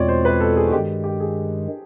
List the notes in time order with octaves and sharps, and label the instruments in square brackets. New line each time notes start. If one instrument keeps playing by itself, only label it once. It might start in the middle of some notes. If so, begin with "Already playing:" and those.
Already playing: [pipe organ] E2 B2 G#3 C4 F4 [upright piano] C#5 D5
[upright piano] C5
B4
A4
G#4
F#4
[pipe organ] G2 [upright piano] G4
[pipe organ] D#3 G#3
[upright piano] G4
G#4